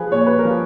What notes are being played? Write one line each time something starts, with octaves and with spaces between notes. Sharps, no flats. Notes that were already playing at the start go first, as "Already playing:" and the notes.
Already playing: F3 G#4 B4
A#2 C#5
B4
A#4
F3